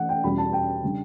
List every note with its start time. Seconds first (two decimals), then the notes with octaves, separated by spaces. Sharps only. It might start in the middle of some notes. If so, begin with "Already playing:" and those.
Already playing: E3 A3 F#5
0.09 G5
0.24 E2 B2 G3 C#4 B5
0.38 A5
0.53 G5
0.83 C#3 G3 D4